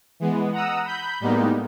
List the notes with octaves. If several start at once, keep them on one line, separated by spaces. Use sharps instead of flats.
E3 G#3 B3
F#5 A#5 D#6 E6
B5 G6
A2 G3 G#3 A#3 B3 D#4